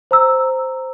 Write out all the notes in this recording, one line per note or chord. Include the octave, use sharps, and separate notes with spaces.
C5 A#5 E6